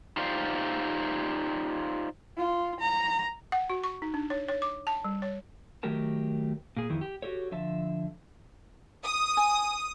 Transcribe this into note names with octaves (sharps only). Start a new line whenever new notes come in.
D#4 F4 G4 C5 D5 F5
F4
A#5
F#5
F#4
C#6
D#4
D4
C#5
C#5
D6
A5
G3
C#5
D#3 F#3 A3 G4 A#4 A5
A#2 G#4
F2 D#3 E3
G4
F#4 G4 A4 C#5
D3 F3 E5 A5
D#6
G#5